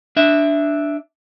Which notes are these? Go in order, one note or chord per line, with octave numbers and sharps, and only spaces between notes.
D4 E5